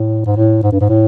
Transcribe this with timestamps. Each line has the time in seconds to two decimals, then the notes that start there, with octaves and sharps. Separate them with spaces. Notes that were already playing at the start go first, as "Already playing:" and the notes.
Already playing: A2
0.26 G#2
0.36 A2
0.63 G#2
0.72 G2
0.81 G#2
0.89 A2